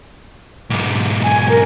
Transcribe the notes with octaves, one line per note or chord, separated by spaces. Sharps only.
B1 G#2
G#5
A#4